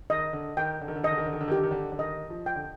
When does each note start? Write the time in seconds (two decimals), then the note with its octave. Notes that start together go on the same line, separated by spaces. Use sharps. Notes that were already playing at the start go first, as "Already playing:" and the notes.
0.10 D#3 D#5
0.33 D3
0.57 D#3 G5
0.81 D3
0.88 D#3
0.95 D3
1.03 D#3 D#5
1.11 D3
1.18 D#3
1.26 D3
1.33 D#3
1.41 D3
1.48 D#3
1.52 D3 G4
1.63 D#3
1.71 D3
1.92 D3
1.99 D#3 D#5
2.30 F3
2.46 G5
2.56 D3